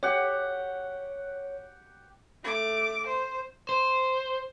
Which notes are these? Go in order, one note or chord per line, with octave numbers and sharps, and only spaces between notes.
G4 C#5 F#5
A3 D6
C5
C5